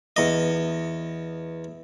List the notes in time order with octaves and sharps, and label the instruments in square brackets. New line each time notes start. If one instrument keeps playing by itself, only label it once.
[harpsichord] E2 D#5